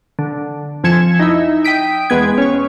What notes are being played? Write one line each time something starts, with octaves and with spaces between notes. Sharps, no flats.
D3
F2 F3 G#5 G#6 C#7 E7
D#4 E4 E5
G5 D#6 B6 D7
E2 G#3 B3 G#6
C#4 C#5